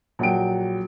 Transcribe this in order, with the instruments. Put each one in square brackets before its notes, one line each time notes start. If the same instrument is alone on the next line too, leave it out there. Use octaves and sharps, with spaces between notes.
[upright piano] A#1 F#3 F#4 G5 D7